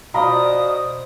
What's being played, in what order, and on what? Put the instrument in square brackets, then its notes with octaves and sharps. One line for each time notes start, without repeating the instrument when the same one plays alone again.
[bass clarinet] B2 [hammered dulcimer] C5 D5 D#5 [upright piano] F5 A#5 B5 [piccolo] D#6